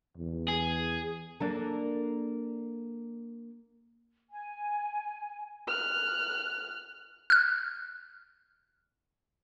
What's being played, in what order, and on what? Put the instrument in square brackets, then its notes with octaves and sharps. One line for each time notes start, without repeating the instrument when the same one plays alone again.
[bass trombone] E2
[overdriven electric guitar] G#4
[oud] A#3 D4 A4
[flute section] G#5
[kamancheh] F6 F#6
[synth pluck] F6 F#6